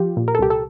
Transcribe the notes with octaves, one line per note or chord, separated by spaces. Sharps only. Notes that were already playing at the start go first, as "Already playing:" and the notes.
Already playing: F3 F4 G4
A#2
A#4
A4
C2 G4
A4